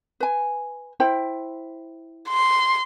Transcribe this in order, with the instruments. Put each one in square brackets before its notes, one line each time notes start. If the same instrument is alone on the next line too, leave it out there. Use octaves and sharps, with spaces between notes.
[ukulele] B4 G#5
E4 C5 G5
[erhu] C6